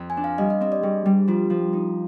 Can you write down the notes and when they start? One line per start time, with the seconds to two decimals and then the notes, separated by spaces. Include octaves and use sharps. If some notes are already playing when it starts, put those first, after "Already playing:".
Already playing: F2
0.10 G#5
0.17 D4
0.24 F5
0.38 G3 D#5
0.50 D#5
0.61 C4 D#5
0.72 D5
0.83 G3 G#4
1.06 G3
1.27 F3 F4
1.50 F3
1.73 D#4